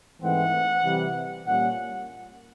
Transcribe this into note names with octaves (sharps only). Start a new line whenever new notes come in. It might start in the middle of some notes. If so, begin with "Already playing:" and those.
G#2 E3 A3 C4 F#5
C3 E3 G3
A#2 G3 A#3 C#4 F#5